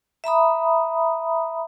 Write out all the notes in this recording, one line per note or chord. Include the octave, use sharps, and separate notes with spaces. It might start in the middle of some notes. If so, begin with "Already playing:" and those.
E5 A#5 B5 D#6